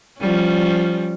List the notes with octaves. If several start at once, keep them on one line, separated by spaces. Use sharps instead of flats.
F3 G3 C#4